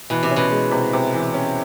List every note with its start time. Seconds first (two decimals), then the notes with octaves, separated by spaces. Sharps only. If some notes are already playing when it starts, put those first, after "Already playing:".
0.10 B2 E3
0.23 C3
0.31 C#4
0.36 B2
0.51 G#3
0.71 C3
0.93 C3
1.13 E3
1.34 C#4